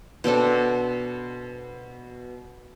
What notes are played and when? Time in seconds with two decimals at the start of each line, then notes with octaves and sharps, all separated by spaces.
0.24 B2 C4 D4 A4